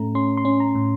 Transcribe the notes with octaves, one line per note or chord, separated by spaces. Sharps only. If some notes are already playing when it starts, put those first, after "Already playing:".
Already playing: A2 A3 C#4 A#5
C#4 C6
C6
C#4
A#5
A2